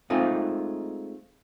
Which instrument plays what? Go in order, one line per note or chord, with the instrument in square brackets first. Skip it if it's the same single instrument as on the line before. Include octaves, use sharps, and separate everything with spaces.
[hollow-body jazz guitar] G#3 A3 C4 D#4 F4